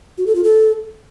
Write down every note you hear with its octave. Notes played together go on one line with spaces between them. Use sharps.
F#4
A4
F4
A4